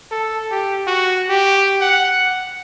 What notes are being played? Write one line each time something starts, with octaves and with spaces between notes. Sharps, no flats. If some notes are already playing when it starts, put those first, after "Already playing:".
A4
G4
F#4
G4
F#5